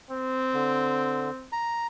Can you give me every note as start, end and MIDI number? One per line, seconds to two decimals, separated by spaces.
0.11 1.50 60
0.53 1.30 50
1.52 1.87 82